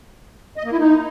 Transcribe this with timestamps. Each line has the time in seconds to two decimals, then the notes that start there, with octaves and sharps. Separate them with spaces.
0.57 D#5
0.65 A#3
0.72 E4
0.80 D#4